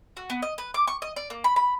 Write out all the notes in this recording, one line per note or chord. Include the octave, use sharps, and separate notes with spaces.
F#4
B3
D#5
B4
D6
C#6
D#5
D5
A#3
B5
B5